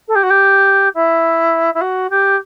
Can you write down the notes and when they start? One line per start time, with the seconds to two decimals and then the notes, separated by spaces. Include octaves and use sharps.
0.08 A4
0.15 G4
0.23 F#4
0.30 G4
0.94 E4
1.74 E4
1.81 F#4
2.10 G4